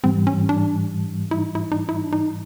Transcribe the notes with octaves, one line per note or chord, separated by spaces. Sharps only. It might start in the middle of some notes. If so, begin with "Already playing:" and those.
G#2 E3 G3 C4
C#4
D4
E4
D#4
E4
D#4
E4
D#4
D4
D#4